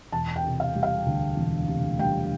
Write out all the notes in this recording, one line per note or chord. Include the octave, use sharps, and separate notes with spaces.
E1 A5
G5
C3
F5
G3
F5
D2
E1
C3
G3 G5